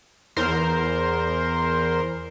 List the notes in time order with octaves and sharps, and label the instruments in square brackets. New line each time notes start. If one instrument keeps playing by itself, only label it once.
[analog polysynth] E2 A#4 C5 C6